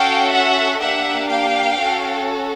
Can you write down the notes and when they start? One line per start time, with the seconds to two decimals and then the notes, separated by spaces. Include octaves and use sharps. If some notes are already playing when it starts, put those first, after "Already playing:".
Already playing: C#4 F#4 A4 F5 G5
0.32 E5 F#5
0.80 A#3 D4 G4 E5 F#5
1.29 F5 G5
1.79 C#4 F#4 A4